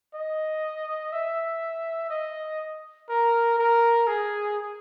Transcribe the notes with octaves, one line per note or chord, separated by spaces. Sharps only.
D#5
E5
D#5
A#4
A#4
G#4